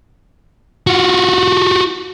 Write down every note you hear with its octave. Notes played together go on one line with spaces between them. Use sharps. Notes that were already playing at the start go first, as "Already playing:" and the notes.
F4 F#4